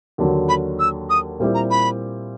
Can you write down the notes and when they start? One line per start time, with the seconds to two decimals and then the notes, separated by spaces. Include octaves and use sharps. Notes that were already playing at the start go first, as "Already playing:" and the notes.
0.18 D#2 D3 F#3
0.49 B5
0.79 E6
1.10 D#6
1.40 A#2 G3 C4 E4 G4
1.54 A#5
1.71 B5